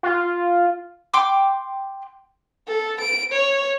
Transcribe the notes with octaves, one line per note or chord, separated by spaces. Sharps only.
F4
G5 C6 D6
A4
D7
C#5